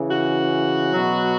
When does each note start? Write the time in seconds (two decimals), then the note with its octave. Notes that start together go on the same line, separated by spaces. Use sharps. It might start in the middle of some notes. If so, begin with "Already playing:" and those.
Already playing: C#3 E3
0.11 F#4
0.93 B2 F#3